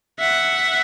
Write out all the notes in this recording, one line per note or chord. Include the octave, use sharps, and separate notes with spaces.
E5 F#5